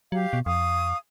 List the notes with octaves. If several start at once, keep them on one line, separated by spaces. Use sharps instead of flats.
F#3 G4 F5
B2
F2 F5 C#6 D#6